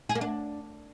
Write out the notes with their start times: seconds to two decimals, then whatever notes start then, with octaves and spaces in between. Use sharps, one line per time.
0.09 G#4
0.15 A#3
0.21 D4